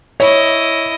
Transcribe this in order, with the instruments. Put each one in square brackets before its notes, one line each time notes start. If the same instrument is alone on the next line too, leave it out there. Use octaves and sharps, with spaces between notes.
[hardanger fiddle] E4 D#5 [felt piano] C#5